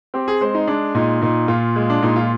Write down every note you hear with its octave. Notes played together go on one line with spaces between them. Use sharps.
C4 G4
G#4
G#3 C5
D#4
G#3 D4
A#2 D#4
A#2 D#4
A#2 F4
G#3
D4
A#2 D#4
F4